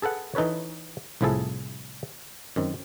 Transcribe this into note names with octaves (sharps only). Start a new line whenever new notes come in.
G#4 A4 B4 F#5
E3 D#4 A4 B4 C#5
C2 A2 F3 E4 G#4 A4
F#2 D#3 C4